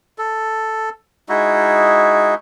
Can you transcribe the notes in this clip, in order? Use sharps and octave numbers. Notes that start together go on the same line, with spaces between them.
A4
G#3 D#4 E4 F#4